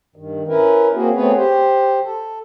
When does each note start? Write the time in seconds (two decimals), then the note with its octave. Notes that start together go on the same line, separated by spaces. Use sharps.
0.16 G2 D#3
0.48 C#4 E4 A#4 B4
0.94 A#3 C4 C#4 F#4 G#4
1.15 A3 B3 C4 G#4 B4 C#5
1.36 G4 C5
2.04 A4